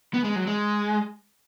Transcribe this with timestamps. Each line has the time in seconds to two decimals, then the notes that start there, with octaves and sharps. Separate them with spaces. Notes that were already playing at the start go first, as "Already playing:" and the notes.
0.14 B3
0.24 G#3
0.36 F#3
0.47 G#3